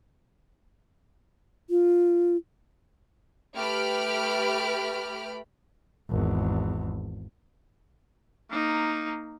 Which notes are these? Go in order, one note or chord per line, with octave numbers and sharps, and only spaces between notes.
F4
A3 G4 B4 B5 F6 D7
G#1 E2
A#3 D#4